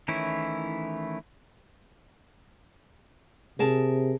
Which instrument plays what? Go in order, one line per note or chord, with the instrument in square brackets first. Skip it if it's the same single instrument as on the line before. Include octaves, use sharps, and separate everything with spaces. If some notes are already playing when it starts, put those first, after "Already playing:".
[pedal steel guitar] D#3 E3 A3 C#4 E4
[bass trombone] C3 [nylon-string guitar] G#4 A#4 A5